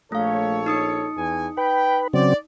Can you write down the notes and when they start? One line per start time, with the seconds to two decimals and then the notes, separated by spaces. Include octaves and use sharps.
0.12 A#1 A3 A4 C#5 F5
0.66 D#4 D#6 C#7
1.17 E2 G#5
1.57 B4 G5
2.14 C#3 F#3 C4 D5